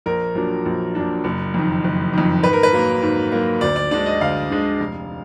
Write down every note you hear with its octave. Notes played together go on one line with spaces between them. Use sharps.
A#1 A#4
A#2 F#3 D4
A#1
A#2 F#3 D4
F#1
F2 D#3
F#1
F2 D#3
G#2 B4
A#4
B4
F#3 A#3
G#2
F#3 A#3
D2 D5
D5
D3 G#3 D4 D5
D#5
D2 F5
D3 G#3 D4
F1